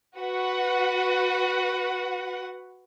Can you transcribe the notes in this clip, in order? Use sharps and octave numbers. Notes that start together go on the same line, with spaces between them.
F#4 B4 F#5